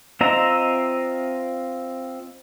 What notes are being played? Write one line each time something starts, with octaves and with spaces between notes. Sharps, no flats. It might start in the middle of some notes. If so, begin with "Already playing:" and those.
C4 F4 D#5 E5 A#5